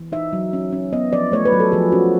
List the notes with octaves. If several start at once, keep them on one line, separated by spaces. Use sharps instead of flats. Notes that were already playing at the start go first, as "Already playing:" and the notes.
Already playing: E3
D#4 E5
F#3
C#4
C#4
B3 D#5
F3 D5
A3 C#5
B4
F#3
A4
F3 G#4
C#4 F#4